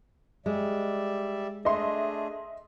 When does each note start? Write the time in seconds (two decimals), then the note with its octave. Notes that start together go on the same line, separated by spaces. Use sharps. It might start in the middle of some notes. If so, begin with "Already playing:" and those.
0.46 G3 G#3 D5 E5
1.65 A3 D4 G#4 D#5 E5 C6